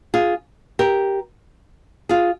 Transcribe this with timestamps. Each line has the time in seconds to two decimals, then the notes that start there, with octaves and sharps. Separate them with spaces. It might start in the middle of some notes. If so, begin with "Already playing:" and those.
0.14 F4 G#4
0.79 G4 A#4
2.09 F4 G#4